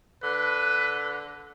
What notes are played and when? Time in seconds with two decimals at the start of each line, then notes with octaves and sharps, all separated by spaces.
0.23 D3 B4